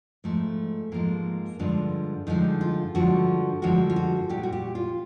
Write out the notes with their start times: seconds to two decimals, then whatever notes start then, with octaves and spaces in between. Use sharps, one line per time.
0.24 G#2 F3 G#3 A3
0.92 G#2 F3 G#3 A#3
1.59 G2 D3 F3 G#3 D4
2.27 G2 D3 F3 G#3 D#4
2.61 F4
2.95 G2 D3 F3 G#3 F#4
3.62 G2 D3 F3 G#3 F#4
3.90 F4
3.96 F#4
4.29 A#2 G3 G4
4.43 F#4
4.52 G4
4.75 F4